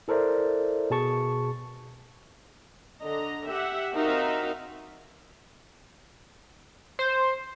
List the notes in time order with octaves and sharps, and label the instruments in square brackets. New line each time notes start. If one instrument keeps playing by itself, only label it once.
[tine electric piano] E4 A4 A#4 C5 D5 E5
B2 G#4 A5 C#6
[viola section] D3 D#5 A#5
G4 E5 F#5
C4 D#4 F#4 A#4 E5 F5
[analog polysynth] C5